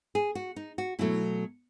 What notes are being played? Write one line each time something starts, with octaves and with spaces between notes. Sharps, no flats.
G#4
F#4
D#4
F#4
B2 F#3 A3 E4